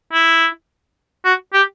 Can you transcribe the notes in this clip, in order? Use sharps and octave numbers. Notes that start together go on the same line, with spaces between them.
E4
F#4
G4